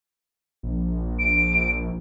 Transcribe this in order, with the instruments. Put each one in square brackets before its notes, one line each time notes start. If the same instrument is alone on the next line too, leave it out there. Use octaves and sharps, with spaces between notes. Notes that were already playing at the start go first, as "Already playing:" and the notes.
[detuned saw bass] A#1
[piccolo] D7